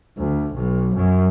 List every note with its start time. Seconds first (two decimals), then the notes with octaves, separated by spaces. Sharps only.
0.18 D2
0.53 B1
0.95 F#2